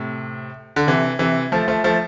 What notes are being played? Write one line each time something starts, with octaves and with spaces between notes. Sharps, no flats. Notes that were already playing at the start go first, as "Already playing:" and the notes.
Already playing: A2 C3
D3
C3 E3
C3 E3
F3 A3
F3 A3
F3 A3